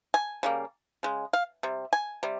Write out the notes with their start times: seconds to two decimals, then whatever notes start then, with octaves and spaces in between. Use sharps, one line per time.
0.14 G#5
0.43 C#3 G3 A#3
1.03 C#3 G#3
1.33 F5
1.63 C3 G3
1.93 G#5
2.23 C3 G3